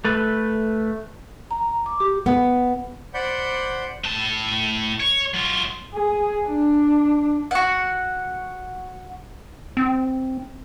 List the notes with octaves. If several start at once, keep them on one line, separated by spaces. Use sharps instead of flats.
A3 B4
A#5
D6
G4
B3
C5 D5 F#5 B5 G6
A2 A5
C#5
F#3 F4
G#4
D4
F#4 F#5
C4